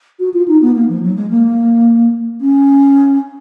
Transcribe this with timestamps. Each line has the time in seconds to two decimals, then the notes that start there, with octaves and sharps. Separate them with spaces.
0.19 F#4
0.33 F4
0.48 D#4
0.61 B3
0.75 A#3
0.88 F3
1.03 F#3
1.16 G#3
1.30 A#3
2.41 C#4